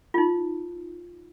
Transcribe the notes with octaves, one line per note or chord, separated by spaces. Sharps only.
D#4 F4